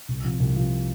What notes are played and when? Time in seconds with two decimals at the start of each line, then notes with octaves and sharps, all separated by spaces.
0.08 C2
0.24 C3 F3
0.40 C2
0.56 C3 F3